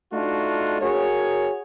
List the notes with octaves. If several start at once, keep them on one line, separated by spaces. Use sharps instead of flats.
A3 D4 D#4 F4 F#4
F#4 G#4 A#4 C#5